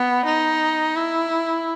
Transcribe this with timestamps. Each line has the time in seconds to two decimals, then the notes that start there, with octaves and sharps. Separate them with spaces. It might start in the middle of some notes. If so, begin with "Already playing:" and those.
Already playing: B3
0.26 D#4
0.96 E4